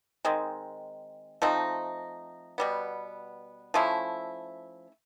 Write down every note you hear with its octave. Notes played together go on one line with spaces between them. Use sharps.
D#3 G#3 C4
F3 A3 C4 D#4
B2 G3 B3
F3 A3 C#4 E4